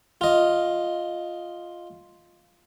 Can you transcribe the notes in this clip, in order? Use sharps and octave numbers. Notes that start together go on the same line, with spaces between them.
F4 D#5